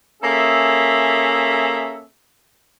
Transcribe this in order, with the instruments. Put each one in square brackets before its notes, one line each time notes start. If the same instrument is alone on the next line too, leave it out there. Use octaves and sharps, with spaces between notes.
[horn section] A#3 C#4 G#4 A4 E5